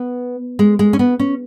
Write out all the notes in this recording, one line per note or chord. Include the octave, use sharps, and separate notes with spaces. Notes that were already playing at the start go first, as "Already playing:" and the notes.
Already playing: B3
G#3
G#3
C#4
B3
C#4